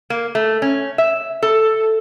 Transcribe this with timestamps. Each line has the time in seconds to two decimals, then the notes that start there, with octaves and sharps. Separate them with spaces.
0.10 A#3
0.35 A3
0.62 C#4
0.98 E5
1.43 A4